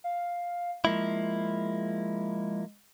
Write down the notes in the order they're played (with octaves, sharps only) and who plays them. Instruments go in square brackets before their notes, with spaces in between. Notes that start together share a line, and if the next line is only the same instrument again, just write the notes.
[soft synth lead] F5
[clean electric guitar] F3 A#3 E4 [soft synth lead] G#3